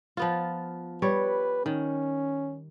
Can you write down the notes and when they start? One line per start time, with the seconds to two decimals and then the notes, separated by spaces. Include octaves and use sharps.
0.17 F3 B3 F4
1.02 G3 B4 C#5
1.66 D#3 C#4